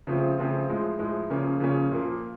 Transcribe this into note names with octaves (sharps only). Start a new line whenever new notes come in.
C#3 F3 A3 C4 F4
C#3 F3 A3 C4 F4
A2 F3 G#3
A2 F3 G#3
C#3 F3 A#3 C#4
C#3 F3 A#3 C#4
A#2 F3 A#3